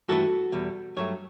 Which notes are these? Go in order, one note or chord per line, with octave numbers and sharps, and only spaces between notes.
G2 E3 A3 F#4 A4
E2 B2 G3
G2 F#3 A3 C#5